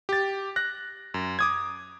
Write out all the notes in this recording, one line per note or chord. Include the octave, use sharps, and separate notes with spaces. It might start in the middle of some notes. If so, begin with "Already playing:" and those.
G4 A6
F#6 A#6
F#2
D6 D#6 G#6